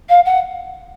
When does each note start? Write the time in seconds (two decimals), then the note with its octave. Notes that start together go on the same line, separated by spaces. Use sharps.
0.09 F5
0.25 F#5